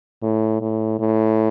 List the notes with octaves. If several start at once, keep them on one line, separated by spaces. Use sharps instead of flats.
A2
A2
A2